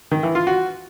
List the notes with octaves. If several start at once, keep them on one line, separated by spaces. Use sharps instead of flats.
D#3
E3
F4
F#4